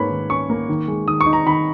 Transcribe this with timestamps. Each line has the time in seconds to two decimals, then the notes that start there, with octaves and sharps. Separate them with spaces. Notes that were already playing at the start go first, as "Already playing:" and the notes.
Already playing: G#2 A#3 C#4 B4 C#5 B5
0.10 D#3
0.30 C#4 C#6
0.50 A#3
0.69 D#3
0.88 G#3
1.08 D#3 D#6
1.21 C#6
1.26 D#4
1.33 A#5
1.46 D#3 B5